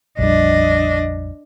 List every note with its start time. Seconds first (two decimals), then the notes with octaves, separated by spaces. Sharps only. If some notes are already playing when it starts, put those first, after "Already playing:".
0.19 A#1 F2 G3 D4 D#5